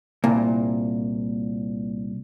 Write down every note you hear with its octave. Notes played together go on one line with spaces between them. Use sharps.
C2 A#2